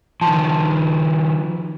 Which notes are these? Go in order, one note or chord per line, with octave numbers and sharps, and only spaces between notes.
D#3 F3 A5 C6 C#6